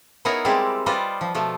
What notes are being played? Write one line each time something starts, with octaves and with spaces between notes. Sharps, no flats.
B3 D#4 E4 G#4 A#4 C#5
G3 G#3 C4 E4 G4 D5
G3 F4 B4 C5 D5 D#5
F3
B2 F3 A3